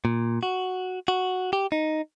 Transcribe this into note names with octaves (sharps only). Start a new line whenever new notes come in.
A#2
F#4
F#4
G4
D#4